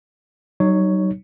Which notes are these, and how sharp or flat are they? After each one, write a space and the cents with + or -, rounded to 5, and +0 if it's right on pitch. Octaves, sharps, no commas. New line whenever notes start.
F#3 +40 D#4 -15 C#5 +5